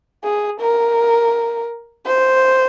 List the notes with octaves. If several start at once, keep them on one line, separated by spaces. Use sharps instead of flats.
G#4
A#4
C5